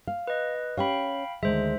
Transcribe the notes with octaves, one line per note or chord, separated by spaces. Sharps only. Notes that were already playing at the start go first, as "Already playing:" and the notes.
F5
B4 D#5
C#4 G4 C#5 F5 G5 B5
D2 D#3 G#3 C5 E5